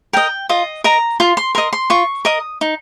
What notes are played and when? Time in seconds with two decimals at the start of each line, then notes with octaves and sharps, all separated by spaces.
0.13 A#4 D#5 G5
0.49 F4 D#5
0.84 A#4 D#5 A#5
1.20 F4 C6
1.37 C6
1.55 A#4 D#5 C6
1.73 C6
1.90 F4 C#6
2.25 A#4 D#5 D#6
2.61 D#4